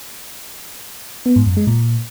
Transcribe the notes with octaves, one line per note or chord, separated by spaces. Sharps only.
B3
G#2
F#2
G#3
A#2